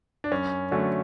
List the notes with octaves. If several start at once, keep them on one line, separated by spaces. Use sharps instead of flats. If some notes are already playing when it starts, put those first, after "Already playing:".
D4
F#2 C#4
D3 F#3 A3 C#4